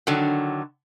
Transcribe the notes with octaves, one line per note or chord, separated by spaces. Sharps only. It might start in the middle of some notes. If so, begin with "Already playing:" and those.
D3 D#3 F#3